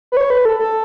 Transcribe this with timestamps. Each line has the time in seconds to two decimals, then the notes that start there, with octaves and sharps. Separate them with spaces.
0.12 B4
0.17 C#5
0.30 B4
0.45 A4
0.59 A4